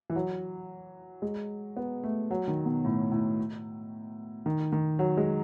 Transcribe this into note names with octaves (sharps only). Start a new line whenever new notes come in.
E3
F#3
G#3
B3
A3
F#3
D#3
B2
A2
A2
D#3
D#3
F#3
G#3